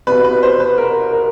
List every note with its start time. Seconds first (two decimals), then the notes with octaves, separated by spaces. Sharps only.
0.07 C2 B2 B4
0.24 B4
0.43 C5
0.60 B4
0.78 A#4
1.13 A#4